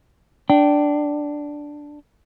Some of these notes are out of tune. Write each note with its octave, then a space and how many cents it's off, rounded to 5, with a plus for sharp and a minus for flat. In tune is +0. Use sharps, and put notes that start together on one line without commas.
D4 +0 G5 -20